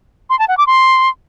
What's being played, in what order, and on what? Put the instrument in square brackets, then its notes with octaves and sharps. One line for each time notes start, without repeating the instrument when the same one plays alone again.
[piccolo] C6
A5
F#5
D6
C6